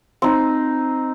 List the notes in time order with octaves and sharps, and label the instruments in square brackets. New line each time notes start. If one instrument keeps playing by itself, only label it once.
[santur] C4 D#4